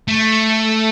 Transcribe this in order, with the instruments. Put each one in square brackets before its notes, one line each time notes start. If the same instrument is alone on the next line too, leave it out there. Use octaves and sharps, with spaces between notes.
[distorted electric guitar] A3